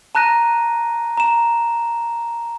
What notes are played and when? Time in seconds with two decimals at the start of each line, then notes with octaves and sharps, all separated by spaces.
0.15 A5 A#5 F#6 A#6 D#7
1.17 A#5 E7